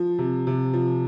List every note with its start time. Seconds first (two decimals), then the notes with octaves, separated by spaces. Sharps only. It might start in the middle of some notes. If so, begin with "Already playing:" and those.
Already playing: F3
0.18 C3
0.47 C3
0.74 F3